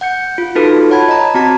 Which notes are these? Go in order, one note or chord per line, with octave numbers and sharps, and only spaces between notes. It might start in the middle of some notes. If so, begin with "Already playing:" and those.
F#5 G6 C#7
F4
D#4 F4 F#4 A4 B4
C#5 F#5 A5 B5 G#6
D#5 A#5
C4 F#4 A5 A#5 G#6